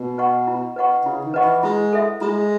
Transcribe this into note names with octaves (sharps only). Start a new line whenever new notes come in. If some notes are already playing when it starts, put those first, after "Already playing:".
Already playing: B2
B4 D#5 F#5 C#6
E4
B4 D#5 F#5 C#6
C#3 E4
D#3
B4 D#5 F#5 C#6
E3
G#3 E4
A4 E5
G#3 E4